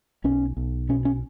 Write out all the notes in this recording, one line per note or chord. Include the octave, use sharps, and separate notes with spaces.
B1 C#4
B1
B2 C#4
C#4